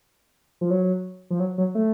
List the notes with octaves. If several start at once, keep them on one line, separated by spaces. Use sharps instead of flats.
F3
F#3
F3
F#3
F#3
A3